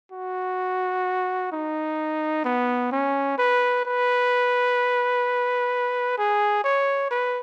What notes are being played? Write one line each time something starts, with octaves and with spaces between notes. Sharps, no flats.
F#4
D#4
B3
C#4
B4
B4
G#4
C#5
B4